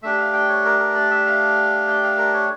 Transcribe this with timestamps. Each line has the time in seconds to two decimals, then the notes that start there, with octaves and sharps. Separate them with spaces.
0.03 A3 D4 G4 E5
0.18 F5
0.33 G5
0.48 C#5
0.65 A#4
0.79 A#4
0.94 D5
1.11 E5
1.26 F5
1.87 G5
2.03 F5
2.18 A#4
2.33 C#5